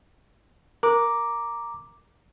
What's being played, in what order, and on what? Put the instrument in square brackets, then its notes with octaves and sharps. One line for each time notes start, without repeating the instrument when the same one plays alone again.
[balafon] A#4 [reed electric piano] A#5 D6